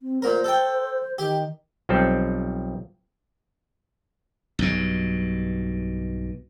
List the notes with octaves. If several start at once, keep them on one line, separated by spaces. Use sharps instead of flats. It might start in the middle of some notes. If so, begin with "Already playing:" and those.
C4
A#2 A#4 C5
A4 G5
D#3 G4
B1 F3 G3 C4 A4
B1 G2 B2